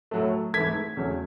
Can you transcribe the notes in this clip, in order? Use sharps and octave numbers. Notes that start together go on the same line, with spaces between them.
A2 F#3 A3
G#2 E3 A3 G#6 B6
E2 C#3 F#3 A3